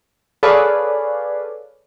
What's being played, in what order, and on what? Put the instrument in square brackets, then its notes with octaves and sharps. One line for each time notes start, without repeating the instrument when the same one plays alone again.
[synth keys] G#4 A4 B4 C#5 D5 F5